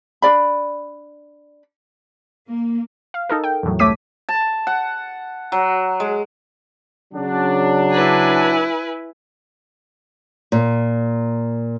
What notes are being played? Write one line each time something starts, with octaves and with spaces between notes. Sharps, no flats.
D4 F4 D5 B5
A#3
F5
D#4 A4 A#4
G5
E2 A2 F#3
C2 A3 C#5 D6 B6 D#7
A5
F#5
F#3
G#3
C#3 F#3 D4
E4 B4 G#5
A#2